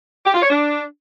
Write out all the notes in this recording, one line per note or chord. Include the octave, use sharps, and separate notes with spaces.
G4
F4
C#5
D4